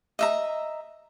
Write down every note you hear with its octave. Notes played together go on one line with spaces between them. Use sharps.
D#5 E5 A#5